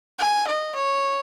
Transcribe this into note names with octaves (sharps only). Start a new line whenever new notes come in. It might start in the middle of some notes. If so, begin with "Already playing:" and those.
G#5
D#5
C#5